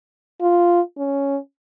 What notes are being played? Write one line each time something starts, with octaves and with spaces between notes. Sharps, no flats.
F4
C#4